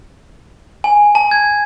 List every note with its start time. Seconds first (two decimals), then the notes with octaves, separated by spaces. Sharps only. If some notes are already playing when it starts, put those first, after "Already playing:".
0.84 G#5
1.15 A5
1.31 G#6